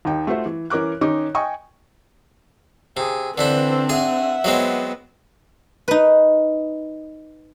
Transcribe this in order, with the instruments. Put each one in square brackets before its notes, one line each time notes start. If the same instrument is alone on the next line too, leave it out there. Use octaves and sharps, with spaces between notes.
[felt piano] D#2 D#4 G5
A3 F4 F#4 C5 E5
E3
E3 C#4 A#4 D6 F#6
D#3 C#4 D#4 D6
D#5 G5 G#5 C#6 D#6
[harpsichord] C3 [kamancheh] G#4
[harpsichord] D3 E3 E4 [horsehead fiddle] C4 D4 [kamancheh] B4 C5
[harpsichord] G#4 G#5 [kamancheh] E5 F#5
[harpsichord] F#3 G#3 C4 [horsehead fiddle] B3
[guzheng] D#4 B4